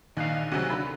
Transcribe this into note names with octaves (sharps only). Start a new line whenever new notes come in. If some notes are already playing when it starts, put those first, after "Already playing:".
A#1 D#3 F5 F#6
D2 C3 F#3 F#4
D3 B5